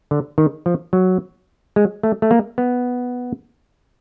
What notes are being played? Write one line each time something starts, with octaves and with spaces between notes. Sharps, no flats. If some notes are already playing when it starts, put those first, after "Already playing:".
D3
D#3
F3
F#3
G#3
A3
A3
A#3
B3